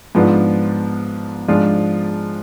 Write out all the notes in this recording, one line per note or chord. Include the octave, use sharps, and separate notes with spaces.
G#2 F3 B3 D4 F4
G#2 F3 G#3 D4 F4